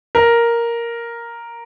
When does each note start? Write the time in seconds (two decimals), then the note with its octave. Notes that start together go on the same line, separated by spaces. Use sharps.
0.15 A#4